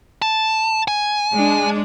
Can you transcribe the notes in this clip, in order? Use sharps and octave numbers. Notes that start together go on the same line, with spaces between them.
A5
G#5
G#3 D4